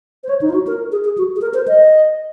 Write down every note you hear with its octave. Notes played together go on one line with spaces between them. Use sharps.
C5
C#5
D#4
F4
F#4
A#4
G#4
G#4
F#4
G#4
A#4
C5
D#5